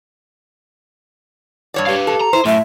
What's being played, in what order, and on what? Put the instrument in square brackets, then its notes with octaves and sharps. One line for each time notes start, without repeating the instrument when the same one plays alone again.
[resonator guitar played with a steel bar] G2 C#5 D5
[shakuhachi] G4 [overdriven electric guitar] B4 F5
[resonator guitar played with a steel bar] A4
[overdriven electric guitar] A#5
[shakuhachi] E4 [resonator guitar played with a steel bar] C5
[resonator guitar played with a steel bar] F#2 [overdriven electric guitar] A2 [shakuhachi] E5